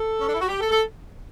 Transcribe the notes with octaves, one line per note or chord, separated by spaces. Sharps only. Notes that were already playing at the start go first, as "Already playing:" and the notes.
Already playing: A4
C#4
D4
E4
F#4
G4
A4
A4